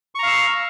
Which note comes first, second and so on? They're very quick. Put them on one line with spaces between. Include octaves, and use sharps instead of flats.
C#6 A#5 F5 E6